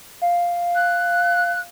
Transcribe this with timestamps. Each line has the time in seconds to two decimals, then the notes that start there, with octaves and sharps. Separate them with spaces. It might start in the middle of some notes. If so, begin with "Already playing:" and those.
0.22 F5
0.75 F#6